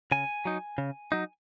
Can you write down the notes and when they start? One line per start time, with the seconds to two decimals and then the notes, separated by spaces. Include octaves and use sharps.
0.11 C#3 G#5
0.45 F#3 D#4
0.78 C#3
1.12 F#3 D#4